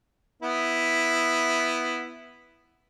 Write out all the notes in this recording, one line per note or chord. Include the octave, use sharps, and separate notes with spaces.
B3 E4